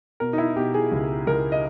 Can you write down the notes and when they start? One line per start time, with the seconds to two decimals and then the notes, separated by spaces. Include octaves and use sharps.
0.20 B2 A#4
0.33 D#4
0.38 E4
0.56 B2 G4
0.74 G#4
0.92 C#2
1.27 C#2 A#4
1.52 D#5